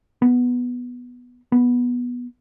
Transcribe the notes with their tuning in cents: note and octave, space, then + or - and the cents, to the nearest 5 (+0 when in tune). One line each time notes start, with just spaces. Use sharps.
B3 -5
B3 -10